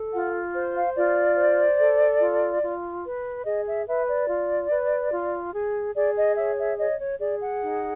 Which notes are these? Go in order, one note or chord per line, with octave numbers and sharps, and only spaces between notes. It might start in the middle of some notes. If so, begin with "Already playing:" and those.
Already playing: A4
F4 F#5
C5
F5
F4 D5
C5
A4
F4
F4
B4
G#4 D#5
E5
B4 E5
D5
F4
B4
F4
G#4
G#4 D5
D#5
C#5 E5
E5
C#5 D#5
C#5
G#4 D5
F#5
D#4